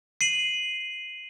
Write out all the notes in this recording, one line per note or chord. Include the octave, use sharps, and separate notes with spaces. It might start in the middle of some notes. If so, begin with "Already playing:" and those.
C7 D#7 F#7